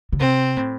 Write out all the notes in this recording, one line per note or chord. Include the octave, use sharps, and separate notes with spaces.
C#3
C3 C4
A2